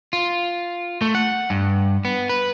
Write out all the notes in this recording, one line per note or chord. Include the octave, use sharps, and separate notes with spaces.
F4
A3
F#5
G2
B3
B4